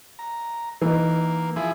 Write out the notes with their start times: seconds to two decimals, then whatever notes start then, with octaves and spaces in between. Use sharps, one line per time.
0.19 A#5
0.82 E3 A#3 D#4
1.56 F3 E4 G#4